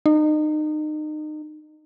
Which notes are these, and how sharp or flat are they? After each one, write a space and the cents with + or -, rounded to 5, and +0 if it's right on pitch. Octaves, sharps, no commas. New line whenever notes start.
D#4 -30